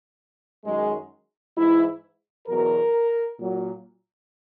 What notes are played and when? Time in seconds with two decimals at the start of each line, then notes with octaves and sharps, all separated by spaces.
0.65 F#2 D#3 F#3 G#3
1.57 G#2 E3 E4
2.48 E2 B2 F#3 A#4
3.39 A#2 F#3